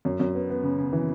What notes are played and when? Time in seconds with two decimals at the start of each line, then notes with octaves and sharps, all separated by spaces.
0.05 F#2
0.20 F#2
0.35 B3
0.50 B3
0.63 C#3
0.78 C#3
0.93 E3